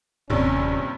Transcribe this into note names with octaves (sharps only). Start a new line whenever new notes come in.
D#1 A#1 G2 C3 C#4